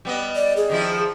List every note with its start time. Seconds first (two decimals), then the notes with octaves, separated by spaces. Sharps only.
0.05 G3 B3 D#5
0.35 D5
0.57 G#4
0.69 D#3 F3 E4